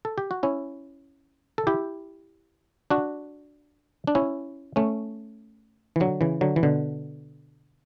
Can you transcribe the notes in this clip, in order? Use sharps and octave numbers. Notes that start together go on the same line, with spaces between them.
A4
G4
F#4
C#4 E4
A4
E4 G4
D4 F#4
D4
C#4 E4
A3 C#4
E3
D3 F#3
C#3 E3
D3 F#3
E3
B2 D3